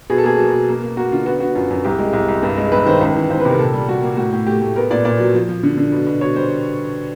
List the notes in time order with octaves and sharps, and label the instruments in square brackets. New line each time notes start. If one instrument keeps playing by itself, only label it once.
[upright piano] B2 G#4
A4
A#3 G#4
F#3
B2
A#3
A#3
A#3 F#4
D3 F4
B3 F#4
D3 F#4
F#2 F4
F#2
C2 G4
G#3
C2
C2
G2
G#3
G2 B4
D#3 C5
C#2
E3
C#2 C5
B4
C3 A#4
A#2 A4
G3
G3 F#4
A#3
A2 F#4
A2
A3 G4
A3
B3 A#4
A#2 D5
A#2 D5
F#3
F3
F3
D3
D3
B2
B2
B2 C#5
G3 C5